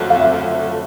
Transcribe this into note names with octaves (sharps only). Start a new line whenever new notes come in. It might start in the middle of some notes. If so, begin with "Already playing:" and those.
Already playing: F2 D3 F#3 A3
F5
E5